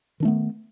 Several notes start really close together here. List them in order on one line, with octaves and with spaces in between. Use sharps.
D#3 D4 A3 B3